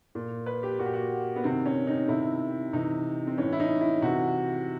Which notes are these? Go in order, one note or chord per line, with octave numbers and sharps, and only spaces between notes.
A#2
B4
G4
A#2 F#4
G4
F#4
B3
C3 D#3 C4
C#4
D#4
C3 D#3 E4
C3 E3 D#4
C4
A2 E3 C#4
E4
D#4
E4
C3 E3 F#4